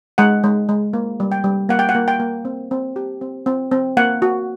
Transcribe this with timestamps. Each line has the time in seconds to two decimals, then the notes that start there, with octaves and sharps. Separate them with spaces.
0.18 G#3 F#5
0.44 G#3
0.69 G#3
0.93 A#3
1.20 G3
1.32 G5
1.44 G3
1.69 A#3 F#5
1.79 G5
1.89 F#5
1.95 A#3
2.08 G5
2.20 A#3
2.45 C4
2.71 C4
2.96 G4
3.21 C4
3.46 C4
3.71 C4
3.97 A#3 F#5
4.22 F#4